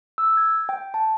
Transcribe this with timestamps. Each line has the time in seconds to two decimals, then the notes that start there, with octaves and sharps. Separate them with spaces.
0.18 E6
0.37 G#6
0.69 G5
0.94 A5